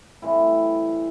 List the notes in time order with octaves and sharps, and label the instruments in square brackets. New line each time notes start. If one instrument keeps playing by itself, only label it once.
[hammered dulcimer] A2 E3 G3 C4 E4